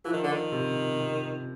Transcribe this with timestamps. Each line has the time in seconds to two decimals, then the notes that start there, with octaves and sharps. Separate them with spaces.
0.05 E3 F3
0.13 D#3
0.24 D3
0.32 D#3
0.52 C3
0.99 C3